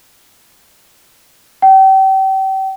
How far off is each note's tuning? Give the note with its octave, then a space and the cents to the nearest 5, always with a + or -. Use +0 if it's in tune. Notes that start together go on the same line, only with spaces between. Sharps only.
G5 -35